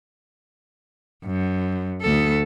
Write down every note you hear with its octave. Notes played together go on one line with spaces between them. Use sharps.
F#2
D2 A4